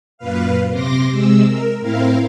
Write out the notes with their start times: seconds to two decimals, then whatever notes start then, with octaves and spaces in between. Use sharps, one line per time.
0.18 F#2 A#2 B4 F5
0.68 C3 C6 D6 A#6
1.11 C3 G#3 E6
1.46 A#4
1.80 A2 C4 E4 A#4 F5